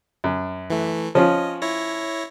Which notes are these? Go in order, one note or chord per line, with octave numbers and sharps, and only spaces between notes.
F#2
E3 A3
F3 C#4 F4 D#5
E4 C#5 A#6